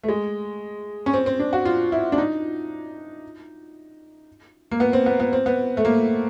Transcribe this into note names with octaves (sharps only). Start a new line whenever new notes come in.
A3
G#3
C#4
C4
C4
D4
F#4
F4
E4
D4
D#4
A#3
B3
C4
B3
B3
C4
B3
A3
A#3